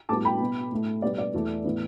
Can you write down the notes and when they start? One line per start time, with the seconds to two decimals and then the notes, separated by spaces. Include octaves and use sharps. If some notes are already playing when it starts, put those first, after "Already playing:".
0.09 A2 G3 B3 A5 D6
0.25 G5 B5
0.40 B2 B3
0.72 A2 A3
1.02 B2 G3 B3 D5
1.18 D5
1.34 E2 E3 A3
1.64 A2 E3 B3